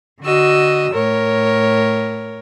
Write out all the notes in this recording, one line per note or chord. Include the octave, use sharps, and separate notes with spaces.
D3 F#4 D#5 E6
A2 A#4 C#5